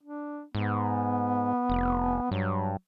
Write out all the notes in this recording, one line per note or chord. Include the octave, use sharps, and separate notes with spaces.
D4
G#2 B3
F1
G2 F#3